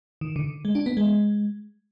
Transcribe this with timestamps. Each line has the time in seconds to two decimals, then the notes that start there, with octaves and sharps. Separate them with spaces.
0.21 D#3
0.36 D3
0.65 G#3
0.75 D4
0.86 B3
0.97 G#3